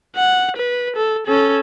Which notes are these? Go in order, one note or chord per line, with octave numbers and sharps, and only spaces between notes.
F#5
B4
A4
C#4 A4